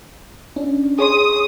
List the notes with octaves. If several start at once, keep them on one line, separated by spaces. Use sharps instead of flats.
C#4 D4
G#4 C#5 C6 D#6